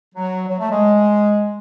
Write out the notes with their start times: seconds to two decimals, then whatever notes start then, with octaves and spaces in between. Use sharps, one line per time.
0.15 F#3
0.48 F#3
0.59 A3
0.71 G#3